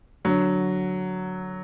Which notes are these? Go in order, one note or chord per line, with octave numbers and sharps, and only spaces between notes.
D3 F#3